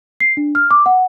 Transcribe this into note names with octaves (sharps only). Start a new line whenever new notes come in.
C7
D4
F6
D6
F#5